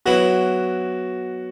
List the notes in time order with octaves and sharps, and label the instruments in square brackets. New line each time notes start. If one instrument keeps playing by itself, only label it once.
[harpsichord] F#3 B3 E4 [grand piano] F#4